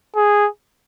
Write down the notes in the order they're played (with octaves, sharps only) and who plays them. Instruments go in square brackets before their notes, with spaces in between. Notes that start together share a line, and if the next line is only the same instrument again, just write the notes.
[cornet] G#4